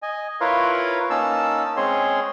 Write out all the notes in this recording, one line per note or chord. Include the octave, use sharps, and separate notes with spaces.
D#5 G#5
E4 F4 A#4 B4 C#5 F5
A#3 C#4 D#4 A5 E6
G#3 C4 C#4 G#4 C#5 C6